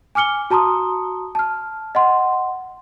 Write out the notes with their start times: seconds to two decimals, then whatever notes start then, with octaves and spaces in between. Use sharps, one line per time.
0.15 G#5 D6 F6 C#7 G7
0.50 F#4 A5 A#5 C6 D#6
1.35 A5 F6
1.95 D#5 F#5 C6